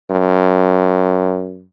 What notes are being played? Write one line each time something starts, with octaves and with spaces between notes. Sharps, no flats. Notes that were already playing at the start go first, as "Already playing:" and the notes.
F#2